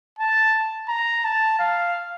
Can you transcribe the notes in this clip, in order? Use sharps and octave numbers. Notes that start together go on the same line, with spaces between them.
A5
A#5
A5
F5